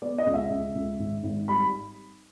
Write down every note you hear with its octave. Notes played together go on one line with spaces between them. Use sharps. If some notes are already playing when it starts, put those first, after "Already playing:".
B3 D5
D#5
C#2
E5
C#2
C#2
G#1
G#1
G3 B5